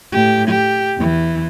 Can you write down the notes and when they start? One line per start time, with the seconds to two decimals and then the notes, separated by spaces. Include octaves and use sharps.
0.12 A2 G4
0.48 G4
0.98 E2 E3